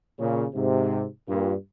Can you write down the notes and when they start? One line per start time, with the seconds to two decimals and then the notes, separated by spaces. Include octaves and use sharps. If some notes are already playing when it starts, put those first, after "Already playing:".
0.19 A#2 C#3
0.54 G#2 C3
1.27 G2 A#2